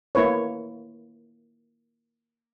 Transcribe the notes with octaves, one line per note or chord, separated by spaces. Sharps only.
A#3 E4 B4 C#5